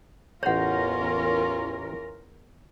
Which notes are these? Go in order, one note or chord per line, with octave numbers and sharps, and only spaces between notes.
A1 E2 C#4 F4 A#4 C#5 F#5 A#5